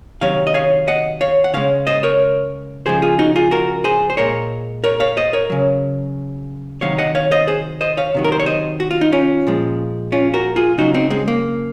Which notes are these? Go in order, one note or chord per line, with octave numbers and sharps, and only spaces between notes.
C3 D#3 F#3 C#5 F5
D#5
C#5 F5
D#5 F#5
C#5 F5
F#5
C#3 G#3 C#5 F5
C5 D#5
A#4 C#5
C#3 F3 G#3 G#4 C5
F4 G#4
D#4 F#4
F4 G#4
F#4 A#4
G#4 C5
C5
A#2 G#3 A#4 C#5
A#4 C#5
C#5 F5
C5 D#5
A#4 C#5
C#3 F#3
C3 D#3 F#3 C#5 F5
D#5 F#5
C#5 F5
C5 D#5
G#4 C5
C5 D#5
C#5 F5
C3 D#3 F#3
A#4
C5
C#5
C5 D#5
F#4
F4
D#4
C#4 F4
A#2 F3 G#3
C#4 F4
F#4 A#4
F4 G#4
C#3 F#3 D#4 F#4
C4 D#4
G#3 C4
A#3